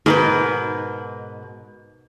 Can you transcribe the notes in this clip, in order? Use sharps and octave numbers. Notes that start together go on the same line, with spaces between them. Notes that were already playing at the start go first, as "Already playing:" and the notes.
G#2 B2 A#4 B4